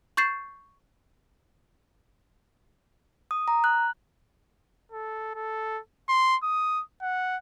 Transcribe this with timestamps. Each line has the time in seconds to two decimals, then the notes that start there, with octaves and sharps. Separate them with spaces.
0.17 C#6 G6 A6 C7 E7
3.31 D#6
3.48 A#5
3.64 F#6
4.92 A4
5.35 A4
6.08 C6
6.43 D#6
7.02 F#5